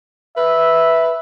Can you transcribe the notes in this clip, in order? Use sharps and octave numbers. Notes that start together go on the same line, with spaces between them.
B4 E5